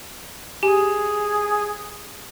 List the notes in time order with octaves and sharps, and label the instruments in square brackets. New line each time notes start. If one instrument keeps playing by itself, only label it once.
[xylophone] G4 G#5 [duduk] G#4